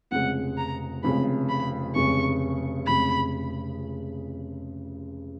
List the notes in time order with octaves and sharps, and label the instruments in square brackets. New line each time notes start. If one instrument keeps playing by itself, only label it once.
[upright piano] F1 F2 C#3 G#3 [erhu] F#5
[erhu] A#5
[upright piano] F1 F2 C#3 G#3 [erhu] B5
[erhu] B5
[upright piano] F1 F2 C#3 G#3 [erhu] C#6
[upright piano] F1 F2 C#3 G#3 [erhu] B5